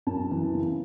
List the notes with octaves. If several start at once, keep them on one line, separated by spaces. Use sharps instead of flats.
F#2 A5
E3
C#3